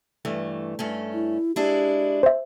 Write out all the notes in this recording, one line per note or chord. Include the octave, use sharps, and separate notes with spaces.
G2 E3 A3
G2 A3 C#4
E4
G#3 D4 E4 G4
C5 E5